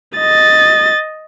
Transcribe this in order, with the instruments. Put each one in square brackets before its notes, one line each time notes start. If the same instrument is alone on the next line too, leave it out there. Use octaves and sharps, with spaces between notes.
[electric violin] D#5 A6